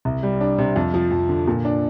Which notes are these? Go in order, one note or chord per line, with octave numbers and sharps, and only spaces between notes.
C2
G3
D4
C3
F2
F3
F2
D3
A#2
D4